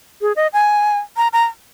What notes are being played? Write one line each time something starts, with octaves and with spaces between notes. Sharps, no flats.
G#4
D#5
G#5
A#5
A#5